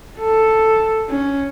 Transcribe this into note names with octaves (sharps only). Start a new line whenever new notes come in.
A4
C#4